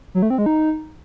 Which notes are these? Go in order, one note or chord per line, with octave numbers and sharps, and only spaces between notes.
F#3
A3
C4
G#3
D#4